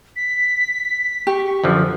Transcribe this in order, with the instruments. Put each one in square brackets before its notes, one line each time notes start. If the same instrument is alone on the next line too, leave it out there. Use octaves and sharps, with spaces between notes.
[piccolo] B6
[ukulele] G4 [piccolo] C#6
[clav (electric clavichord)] F#2 D3 F3